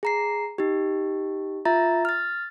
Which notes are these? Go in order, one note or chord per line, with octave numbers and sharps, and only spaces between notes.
G#4 A#5 C7
D#4 G4
F4 E5 A#5 A6
F6 A6